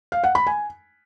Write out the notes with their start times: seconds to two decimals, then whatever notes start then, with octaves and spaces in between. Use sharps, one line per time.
0.12 F5
0.24 F#5
0.35 B5
0.47 G#5